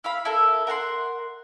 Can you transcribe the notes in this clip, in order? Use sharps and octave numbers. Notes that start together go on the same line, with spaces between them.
E4 F5 B5
E4 A4 A#4
A#4 F#5 A5 C6